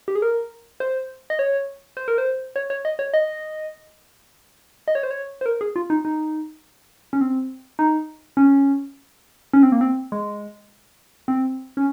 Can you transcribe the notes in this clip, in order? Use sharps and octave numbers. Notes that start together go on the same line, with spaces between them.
G4
G#4
A#4
C5
D#5
C#5
C5
A#4
C5
C#5
C#5
D#5
C#5
D#5
D#5
C#5
C5
C#5
C5
A#4
G#4
F4
D#4
D#4
C#4
C4
D#4
C#4
C#4
C4
A#3
C4
G#3
C4
C#4